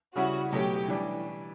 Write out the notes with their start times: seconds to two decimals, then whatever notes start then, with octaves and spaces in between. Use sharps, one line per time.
0.15 C#3 G3 C#4 E4 F#4
0.51 B2 F#3 A3 C#4 G4
0.88 E3 G3 D4